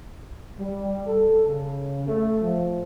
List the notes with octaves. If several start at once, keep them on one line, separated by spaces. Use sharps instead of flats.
G3
A4
C#3
A3
F3